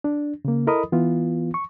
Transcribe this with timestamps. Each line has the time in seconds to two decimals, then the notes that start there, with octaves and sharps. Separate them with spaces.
0.04 D4
0.45 C#3 A#3
0.67 E4 A4 A#4 D#5 B5 D#6
0.92 E3 B3 F4
1.54 C#6